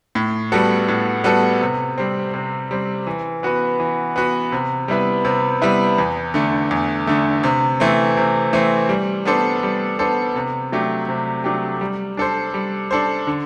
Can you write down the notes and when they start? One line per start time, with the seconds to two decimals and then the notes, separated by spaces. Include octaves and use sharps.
0.15 A2
0.52 G3 B3 F#4 A4
0.88 A2
1.24 G3 B3 F#4 A4
1.61 C3
1.98 G3 C4
2.34 C3
2.71 G3 C4
3.07 E3
3.43 B3 F#4 B4
3.80 E3
4.16 B3 F#4 B4
4.52 C3
4.88 G3 B3 E4 B4
5.25 C3
5.62 G3 B3 E4 B4
5.98 E2
6.34 D3 A3
6.71 E2
7.07 D3 A3
7.43 C3
7.80 E3 A3 C4
8.17 C3
8.53 E3 A3 C4
8.89 G3
9.25 B3 D4 A4 C5
9.63 G3
9.99 B3 D4 A4 C5
10.36 C3
10.72 F#3 A3 D4 G4
11.09 C3
11.44 F#3 A3 D4 G4
11.81 G3
12.17 D4 A4 C5
12.54 G3
12.91 D4 A4 C5
13.27 D3